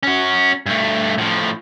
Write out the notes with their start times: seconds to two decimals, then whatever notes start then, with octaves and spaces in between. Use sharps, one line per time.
0.03 C#4 F#4
0.66 G2 A3
1.18 A2 F3